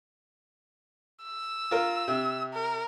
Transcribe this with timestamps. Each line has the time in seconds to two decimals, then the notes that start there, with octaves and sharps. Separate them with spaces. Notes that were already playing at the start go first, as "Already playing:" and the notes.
1.23 E6
1.71 F4 A#4
2.08 C3
2.53 A#4